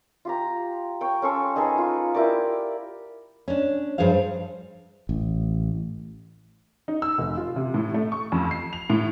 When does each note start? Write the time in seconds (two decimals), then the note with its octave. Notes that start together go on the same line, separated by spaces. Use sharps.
0.25 F4 G4 A#5
1.01 C#5 G5
1.22 C#4 A4 C5 C#6
1.56 D#4 G#4 A4 B4
1.78 F4
2.14 E4 G4 A#4 D5
3.48 C#4 D4
3.98 G2 F3 G#4 C5 F5
5.09 A1
6.88 D#4
7.02 E6
7.18 F1
7.37 F4
7.56 C3
7.74 A2
7.94 A3
8.12 C#6
8.32 F2
8.51 C7
8.73 F7
8.90 A2